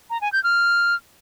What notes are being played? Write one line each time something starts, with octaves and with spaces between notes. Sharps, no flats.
A#5
G#5
G6
F6